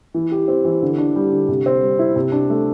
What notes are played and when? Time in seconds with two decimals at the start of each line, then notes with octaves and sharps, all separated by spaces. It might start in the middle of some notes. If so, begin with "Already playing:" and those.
0.14 E3
0.32 G4
0.48 C4
0.65 E3
0.82 D3
0.98 D4
1.16 G3
1.32 D3
1.48 C3
1.66 C4
1.82 G3
1.99 E4
2.16 C3
2.32 D4
2.50 A3